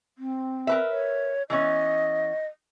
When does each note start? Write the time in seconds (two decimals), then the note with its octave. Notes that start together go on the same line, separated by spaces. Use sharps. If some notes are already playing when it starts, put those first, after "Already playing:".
0.18 C4
0.67 A#4 B4 E5
0.91 C#5
1.50 E3 B3 C#4 D#5